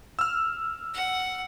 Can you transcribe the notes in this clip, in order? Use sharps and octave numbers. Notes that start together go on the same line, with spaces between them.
E6 F6
F#5